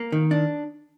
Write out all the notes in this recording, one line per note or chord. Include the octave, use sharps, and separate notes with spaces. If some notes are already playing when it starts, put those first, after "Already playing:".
Already playing: A#3
D#3
D4